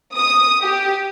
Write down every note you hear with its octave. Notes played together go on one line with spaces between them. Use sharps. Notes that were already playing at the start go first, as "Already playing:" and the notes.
D#6
G4